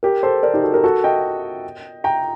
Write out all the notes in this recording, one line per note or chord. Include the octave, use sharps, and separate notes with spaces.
G4 A#4
A4 C5
A#4 D5
D#4 G4
F#4 A4
G4 A#4
F#4 A4
D#5 G5
G5 A#5